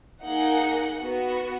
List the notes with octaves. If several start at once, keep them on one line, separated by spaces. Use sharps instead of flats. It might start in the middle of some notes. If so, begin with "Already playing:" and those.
A#3 D#4 G#4 F#5
B3 F#4